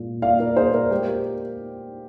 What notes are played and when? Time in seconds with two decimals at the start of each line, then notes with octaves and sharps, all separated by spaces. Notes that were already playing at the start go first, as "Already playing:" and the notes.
Already playing: A#2 G#3
0.22 A#2 D5 F5
0.39 A#4 D5
0.56 A#2 G#4 C5
0.74 A#4 D5
0.91 G#3 G4 A#4
1.08 A#4